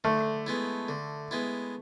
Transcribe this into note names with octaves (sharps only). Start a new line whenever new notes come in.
D3 A3
G#3 B3 E4
D3
G#3 B3 E4